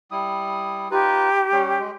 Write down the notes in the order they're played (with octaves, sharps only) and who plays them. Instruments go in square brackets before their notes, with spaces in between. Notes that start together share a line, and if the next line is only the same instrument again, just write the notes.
[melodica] G3 E4 D#6
[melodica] D#4 F4 B4 [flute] G4
[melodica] G3 C#4
G#3